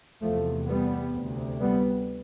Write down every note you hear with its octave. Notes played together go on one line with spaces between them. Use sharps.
E2 C3 F3 A3
G3 B3
D2 C3
G3 B3